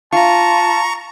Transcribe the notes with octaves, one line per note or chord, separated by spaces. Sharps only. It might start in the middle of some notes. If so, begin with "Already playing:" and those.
F4 A5 A#5 C#6